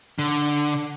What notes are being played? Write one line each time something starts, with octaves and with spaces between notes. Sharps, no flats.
D3